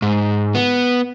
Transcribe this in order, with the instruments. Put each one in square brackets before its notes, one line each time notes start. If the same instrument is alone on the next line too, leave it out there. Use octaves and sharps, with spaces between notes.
[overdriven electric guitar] G#2
B3